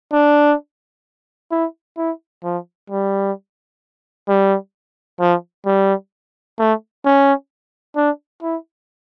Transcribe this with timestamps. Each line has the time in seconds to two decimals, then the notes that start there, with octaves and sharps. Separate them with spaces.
0.12 D4
1.51 E4
1.97 E4
2.43 F3
2.90 G3
4.28 G3
5.20 F3
5.66 G3
6.59 A3
7.05 C#4
7.96 D4
8.42 E4